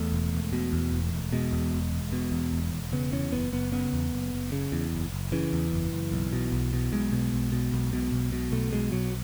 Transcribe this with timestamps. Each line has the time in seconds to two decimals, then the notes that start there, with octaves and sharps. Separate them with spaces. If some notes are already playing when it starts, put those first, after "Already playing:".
Already playing: E2 A3
0.12 E1
0.33 E1
0.53 B2
0.73 E2
0.92 E1
1.12 E1
1.32 B2 G#3
1.52 E2
1.73 E1
1.93 E1
2.12 B2
2.32 E2
2.53 E1
2.73 E1
2.92 C#3 B3
3.12 E2 C#4
3.32 F#1 B3
3.53 F#1 B3
3.72 C#3 B3
3.93 E2
4.13 F#1
4.33 F#1
4.52 C#3
4.72 E2
4.93 F#1
5.12 F#1
5.32 C#3 E3
5.53 E2
5.72 F#1
5.92 F#1
6.12 B1
6.33 B2
6.52 B1
6.73 B2
6.92 B1 G#3
7.12 B2
7.33 B1
7.52 B2
7.73 B1
7.93 B2
8.13 B1
8.32 B2
8.52 B1 A3
8.72 B2 G#3
8.92 B1 F#3